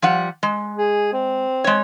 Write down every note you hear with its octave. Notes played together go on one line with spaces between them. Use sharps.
F3 G3 F#5
G#3
G#4
C4
G#3 C#5